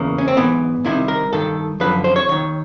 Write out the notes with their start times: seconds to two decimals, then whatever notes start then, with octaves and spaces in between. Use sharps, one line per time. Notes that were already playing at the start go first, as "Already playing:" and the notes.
Already playing: E2 C#3 E3 A#3
0.18 C#4
0.28 C4
0.37 G#2 E3 B3
0.84 C2 C3 D#3 E4
1.08 A#4
1.33 G2 D#3 A4
1.80 F#2 D3 F3 B4
2.04 C5
2.16 C#5
2.29 D#2 D#3 C#5